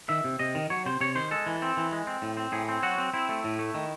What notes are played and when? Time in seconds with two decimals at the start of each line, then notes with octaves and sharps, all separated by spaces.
0.09 D#3 E5
0.24 C3
0.39 C3 D#5
0.55 D#3
0.70 F#3 C#5
0.86 C3 C5
1.01 C3 C#5
1.15 D#3 C5
1.31 G#3 A4
1.46 E3
1.62 C4
1.77 E3
1.92 G#3
2.07 C4
2.22 A2
2.37 C4
2.52 A2 G#4
2.69 C4
2.83 F#3 F#4
2.98 C4
3.14 C4 E4
3.29 A3
3.44 A2
3.59 A3
3.74 D#3